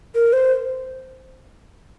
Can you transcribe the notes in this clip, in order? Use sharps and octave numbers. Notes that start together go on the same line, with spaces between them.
A#4
C5